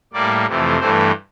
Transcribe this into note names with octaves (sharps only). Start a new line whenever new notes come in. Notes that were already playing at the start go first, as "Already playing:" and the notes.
A2 G3 A#3 D5
F2 C3 E3 A3
G2 E3 A3 C5